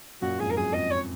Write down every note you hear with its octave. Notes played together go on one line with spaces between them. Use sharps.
F#2 A#2 F#4
F2 G#2 G#4
A#4
F#2 G#4
F2 D#5
C#5